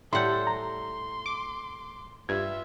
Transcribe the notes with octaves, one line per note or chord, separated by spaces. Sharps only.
A2 G3 A4 F#5 C6 G6
A#5 C6
D6
G2 F4 E5 G#6